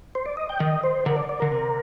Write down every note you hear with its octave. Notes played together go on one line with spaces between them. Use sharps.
C5
D5
D#5
G5
D#3 D#5
C5
D3 A#4
D5
D5
D3 A#4
C3